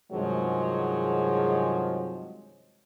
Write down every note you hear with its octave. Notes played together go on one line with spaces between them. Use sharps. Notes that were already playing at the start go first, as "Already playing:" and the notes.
G2 C3 D#3 F3 F#3 G#3